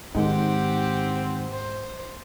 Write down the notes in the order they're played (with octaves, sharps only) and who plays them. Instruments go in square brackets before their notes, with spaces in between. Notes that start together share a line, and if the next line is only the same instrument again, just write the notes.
[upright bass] G#2 [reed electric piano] D#3 G#3 D#4 [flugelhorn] C4 [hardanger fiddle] G4 F#5
[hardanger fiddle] C5